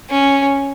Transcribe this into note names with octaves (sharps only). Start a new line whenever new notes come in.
C#4